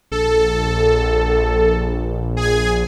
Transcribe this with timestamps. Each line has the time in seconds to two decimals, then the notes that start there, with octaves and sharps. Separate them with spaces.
0.12 A#1 A4
2.37 G#4 G#5